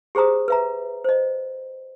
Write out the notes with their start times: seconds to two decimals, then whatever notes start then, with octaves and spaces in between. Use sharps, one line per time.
0.15 G4 G#4 C5 A#5 D#6
0.48 B4 E5 A#5
1.04 C5 D#5